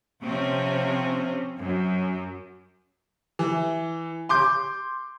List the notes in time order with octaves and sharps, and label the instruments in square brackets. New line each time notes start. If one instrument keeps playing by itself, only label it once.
[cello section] C3 F3 C4 C#4
F#2
[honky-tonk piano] E3
C6 D6 G6